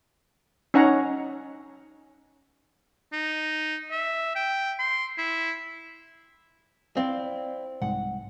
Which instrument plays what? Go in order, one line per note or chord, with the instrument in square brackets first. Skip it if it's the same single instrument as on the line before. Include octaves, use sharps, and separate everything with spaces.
[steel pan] C#4 D#4 C#5 F#5 A#5
[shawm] D#4
E5
G5
C6
E4
[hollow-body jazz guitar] C4 [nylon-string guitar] E4 D5 F5
[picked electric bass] C2 G#2 [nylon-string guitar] F#5